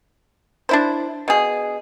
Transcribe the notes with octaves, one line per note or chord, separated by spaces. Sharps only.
D4 E4 C5
B2 G#4